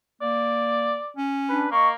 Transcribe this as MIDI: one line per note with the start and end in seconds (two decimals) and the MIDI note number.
0.22 0.98 58
0.22 1.14 74
1.17 1.69 61
1.49 1.65 62
1.49 1.69 71
1.71 1.94 58
1.71 1.86 75
1.71 1.86 85